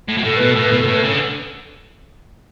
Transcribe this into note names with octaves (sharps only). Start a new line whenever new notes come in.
A2
B2
A2 A4
B2 B4
A2 A4
B4
B2
A4
B2
A2 B4
C#3 A4
D3